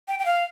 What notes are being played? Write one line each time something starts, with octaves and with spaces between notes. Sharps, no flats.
G5
G5
F5